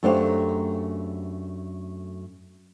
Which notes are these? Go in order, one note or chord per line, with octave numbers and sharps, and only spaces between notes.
F#2 A3 D4 G4 C5 F5